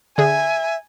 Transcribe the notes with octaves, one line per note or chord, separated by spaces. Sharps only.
D3 G#4 E5 G#5